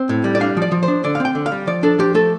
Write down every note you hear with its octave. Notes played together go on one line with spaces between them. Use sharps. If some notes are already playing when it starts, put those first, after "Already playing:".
Already playing: C4
A2
G3
D5
D4 F5
F3 D5
F3
C5
D4
D3 D5
F5
C4
G5
D3
F5
G3
F3 D5
D4 A4
F3 G4
A3 A4